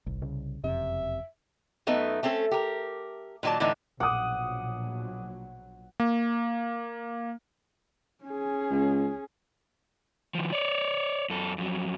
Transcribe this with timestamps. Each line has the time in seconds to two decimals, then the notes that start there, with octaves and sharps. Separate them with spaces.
0.07 G1 C2
0.22 C#3
0.64 F#1 F2 C3 E5
1.87 F#2 A3 B3 D#4
2.23 A3 C4 C#4 A4
2.52 G4 A#4
3.43 A#2 D#3 F#3 D5 A5
3.60 A2 D3 E3 A3 D4 D#4
4.00 A#1 B2 F#3 F#5 D6 D#6
6.00 A#3
8.25 C#4 G#4
8.70 C#2
10.35 D#3 F3
10.52 C#5 D5
11.30 F#2 A4
11.58 F2 F#3